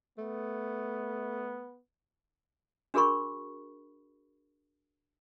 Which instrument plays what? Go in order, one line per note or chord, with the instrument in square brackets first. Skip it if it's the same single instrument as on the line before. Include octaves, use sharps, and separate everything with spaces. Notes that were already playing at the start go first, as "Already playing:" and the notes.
[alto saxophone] A3 [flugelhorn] B3
[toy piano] D4 F#4 G#4 A#4 B5 C#6